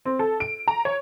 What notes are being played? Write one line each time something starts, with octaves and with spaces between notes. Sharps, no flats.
C4
A4
D7
A#5
C#5